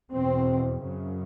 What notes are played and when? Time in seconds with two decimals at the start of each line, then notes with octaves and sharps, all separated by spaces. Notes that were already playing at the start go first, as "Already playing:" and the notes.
0.12 E2 B2 C4
0.84 F#2 C#3